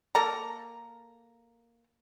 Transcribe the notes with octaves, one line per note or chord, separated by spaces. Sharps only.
A#3 A4 A#5